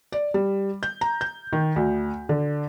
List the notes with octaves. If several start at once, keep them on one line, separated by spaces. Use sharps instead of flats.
D5
G3
G6
A#5
G6
D#3
D2
D3